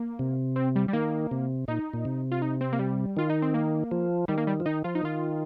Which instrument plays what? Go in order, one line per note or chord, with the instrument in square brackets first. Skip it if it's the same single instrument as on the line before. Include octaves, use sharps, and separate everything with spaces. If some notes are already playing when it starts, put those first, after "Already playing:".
Already playing: [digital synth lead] A#3
[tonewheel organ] C3
[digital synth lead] C4
G3
G3
[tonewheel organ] D#3 [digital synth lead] A#3
[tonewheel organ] C3
[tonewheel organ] A#2 [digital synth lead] D#4
[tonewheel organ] A#2
C3
[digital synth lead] F4
D#4
C4
A#3
G3
[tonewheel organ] D#3 [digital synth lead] F4
[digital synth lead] D#4
C4
A#3
[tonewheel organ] F3
[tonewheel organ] D#3 [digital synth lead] G3
[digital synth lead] A#3
G3
[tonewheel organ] F3
[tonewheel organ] D#3 [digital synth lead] D#4
[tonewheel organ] F3 [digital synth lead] F4
[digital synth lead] D#4
[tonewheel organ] D#3 [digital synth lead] F4